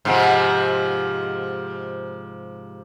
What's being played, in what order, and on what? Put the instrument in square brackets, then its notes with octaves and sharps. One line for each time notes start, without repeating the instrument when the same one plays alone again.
[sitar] G#2 C3 F3